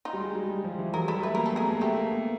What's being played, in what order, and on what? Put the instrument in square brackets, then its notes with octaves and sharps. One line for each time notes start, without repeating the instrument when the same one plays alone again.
[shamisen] D#4 F4
[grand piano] G3
G#3
G3
G3
F3
E3
[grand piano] F#3 [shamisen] G#4 A#4
[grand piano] G3 [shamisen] A4 B4
[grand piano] A3 [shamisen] B4
[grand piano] A#3 [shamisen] A#4
[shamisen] A4
[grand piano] B3 [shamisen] G#4 A#4
[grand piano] A#3
G#3
[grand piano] A3 [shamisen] G4 A4
[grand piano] A#3
B3